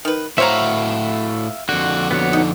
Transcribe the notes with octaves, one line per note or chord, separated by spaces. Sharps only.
D#3 B4
A2 F#4 C5 C#5 E5 F5 A#5
F2 D3 F#4
B3 F#4 C#5
D#4